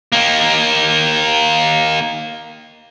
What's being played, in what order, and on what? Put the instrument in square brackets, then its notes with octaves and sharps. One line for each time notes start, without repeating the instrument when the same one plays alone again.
[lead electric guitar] D#3 A#3